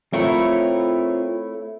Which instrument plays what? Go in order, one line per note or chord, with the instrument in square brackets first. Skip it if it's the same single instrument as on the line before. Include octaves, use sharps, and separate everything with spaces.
[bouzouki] A3 E4 C#5 [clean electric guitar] C4 F4 A#4